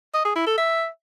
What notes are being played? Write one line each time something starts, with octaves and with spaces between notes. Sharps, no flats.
D#5
G#4
E4
A4
E5